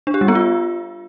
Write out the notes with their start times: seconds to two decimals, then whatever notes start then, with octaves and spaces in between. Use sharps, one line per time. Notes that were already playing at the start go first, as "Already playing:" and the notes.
0.07 D4
0.14 G4
0.21 G3
0.28 B3
0.35 F4